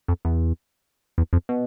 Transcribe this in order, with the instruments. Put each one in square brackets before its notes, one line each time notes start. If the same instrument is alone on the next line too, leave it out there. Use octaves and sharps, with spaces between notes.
[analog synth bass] F2
E2
E2
F2
B2